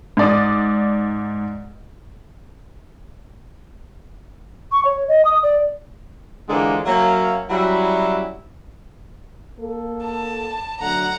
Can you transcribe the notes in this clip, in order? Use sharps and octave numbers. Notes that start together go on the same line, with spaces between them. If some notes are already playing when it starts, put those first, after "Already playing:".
G#2 D5 D#6
C#6
C#5
D#5
D#6
D5
D3 E3 F3 G#3 A#3
F#3 A#3 C#4 C#5 E5 F5
F#3 G3 C#4 E4 F#4 E5
A#3 A4
A5
D3 F#3 A3 F#5 A#5